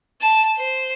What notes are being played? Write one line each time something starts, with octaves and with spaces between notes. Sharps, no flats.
A5
C5